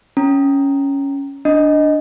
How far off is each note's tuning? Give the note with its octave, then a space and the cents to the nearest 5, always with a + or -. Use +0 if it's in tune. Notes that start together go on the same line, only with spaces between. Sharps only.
C#4 +0 A#5 +0
D4 +0 D#5 +0